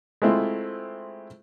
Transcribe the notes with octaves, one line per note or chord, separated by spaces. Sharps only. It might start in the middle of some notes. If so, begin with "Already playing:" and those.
G#3 A3 C4 E4 F4